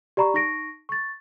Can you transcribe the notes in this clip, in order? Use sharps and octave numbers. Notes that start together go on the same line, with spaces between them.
G4 D5 A#5 B5 C#6
D#4 C#6 A#6 D7
C#6 A6